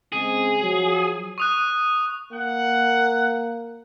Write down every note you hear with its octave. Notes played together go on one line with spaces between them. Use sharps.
C#3 G#3 C4 G#4
F3 F#3
C#6 D#6 F#6
A#3 F#5